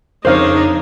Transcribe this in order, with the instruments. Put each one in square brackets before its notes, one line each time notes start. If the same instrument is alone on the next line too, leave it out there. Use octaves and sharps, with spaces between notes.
[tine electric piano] F2 C#3 [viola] D4 D#4 [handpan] A#4 C#5 [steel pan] C5 F5